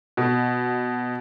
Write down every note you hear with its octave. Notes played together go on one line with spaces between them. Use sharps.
B2